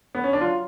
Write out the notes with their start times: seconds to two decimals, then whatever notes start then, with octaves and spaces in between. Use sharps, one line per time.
0.15 B3
0.24 C#4
0.33 D4
0.41 F#3 F4